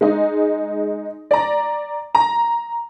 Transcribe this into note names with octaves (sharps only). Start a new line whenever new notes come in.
G#3 D#4
D5 A#5
A#5